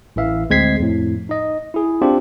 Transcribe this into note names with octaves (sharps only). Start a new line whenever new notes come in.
A1 E3 E5 F5
D2 G#3 C4 G#6 B6 C7
F2 A2
D#4 D#5
E4 G#4
C4 D4 F4 G4